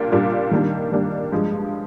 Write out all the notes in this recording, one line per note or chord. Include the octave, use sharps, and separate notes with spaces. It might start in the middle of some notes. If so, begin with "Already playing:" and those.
Already playing: A#2 G3 A#3 D4 F4
A#2 G3 A#3 D4 F4
D#3 G3 A#3 D4
D#3 G3 A#3 D4
G2 F3 G#3